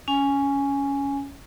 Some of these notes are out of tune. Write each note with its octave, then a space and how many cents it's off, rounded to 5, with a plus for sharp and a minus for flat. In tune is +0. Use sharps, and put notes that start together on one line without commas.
C#4 +10 G#5 +0